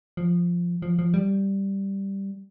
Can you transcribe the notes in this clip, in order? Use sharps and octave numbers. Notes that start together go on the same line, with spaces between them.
F3
F3
F3
G3